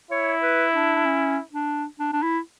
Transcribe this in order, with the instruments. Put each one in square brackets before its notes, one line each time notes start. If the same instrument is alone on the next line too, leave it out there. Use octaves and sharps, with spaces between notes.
[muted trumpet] E4 [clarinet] C#5
[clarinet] B4
D4
D4
C#4
D4
D4
D4
E4